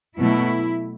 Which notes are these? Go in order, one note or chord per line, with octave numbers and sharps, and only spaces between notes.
B2 F#3 A3 E4